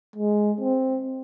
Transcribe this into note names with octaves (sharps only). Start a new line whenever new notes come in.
G#3
C4